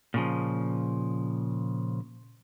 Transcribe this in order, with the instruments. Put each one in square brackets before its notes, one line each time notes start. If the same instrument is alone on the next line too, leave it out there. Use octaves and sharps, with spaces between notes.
[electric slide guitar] A#2 C#3 F3